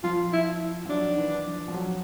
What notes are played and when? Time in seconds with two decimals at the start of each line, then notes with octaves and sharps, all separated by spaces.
0.04 F3 F4
0.33 E4
0.85 F3
0.89 F#3 D4
1.10 D#3
1.18 E3
1.46 F3
1.68 F3
1.74 F#3